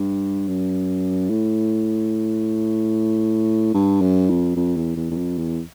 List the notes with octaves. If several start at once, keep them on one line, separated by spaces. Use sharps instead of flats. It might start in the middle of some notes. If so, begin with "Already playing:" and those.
Already playing: G2
F#2
A2
G2
F#2
F2
F2
E2
E2
E2
F2
E2